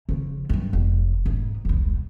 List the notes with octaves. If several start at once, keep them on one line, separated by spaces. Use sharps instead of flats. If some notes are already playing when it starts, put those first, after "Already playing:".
C#3 F3
G2 F#3
F1
G#2
E1 C2